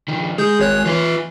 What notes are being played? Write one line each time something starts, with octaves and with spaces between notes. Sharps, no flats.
D#3 F3 D#4
G#3 G#4 G6
G#1 C#5 F#6
E3 F4 E5